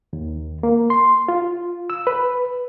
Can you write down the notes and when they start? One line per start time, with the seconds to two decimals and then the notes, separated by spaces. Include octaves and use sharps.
0.13 D#2
0.63 A#3
0.90 C6
1.28 F4
1.90 E6
2.07 B4